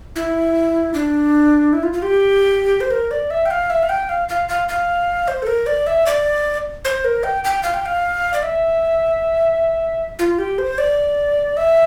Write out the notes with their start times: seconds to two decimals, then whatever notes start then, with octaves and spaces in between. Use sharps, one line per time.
0.16 E4
0.94 D4
1.73 E4
1.83 F4
1.93 F4
2.02 G4
2.81 C5
2.91 A#4
3.11 D5
3.30 E5
3.46 G5
3.51 F5
3.70 E5
3.83 F5
3.89 G5
4.09 F5
4.29 F5
4.49 F5
4.69 F5
5.28 C5
5.42 A4
5.47 A#4
5.66 D5
5.87 E5
6.06 D5
6.85 C5
7.04 A#4
7.23 G5
7.44 G5
7.63 F5
7.74 G5
7.86 F5
8.34 D5
8.42 E5
10.19 F4
10.39 G4
10.58 C5
10.78 D5
11.57 E5